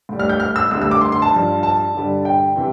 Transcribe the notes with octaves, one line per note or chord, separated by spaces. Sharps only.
A2 G3
F6
G6
F6
E6
D2 D3 G3 E6
E6
D6
C6
C6
A5
G2 F3
A5
G2 D3 G3
G5
C3 E3